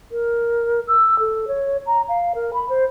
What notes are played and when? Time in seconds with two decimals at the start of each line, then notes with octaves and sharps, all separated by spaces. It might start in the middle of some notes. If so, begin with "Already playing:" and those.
0.12 A#4
0.88 E6
1.19 A4
1.47 C#5
1.86 A#5
2.08 F5
2.35 A#4
2.53 B5
2.69 C5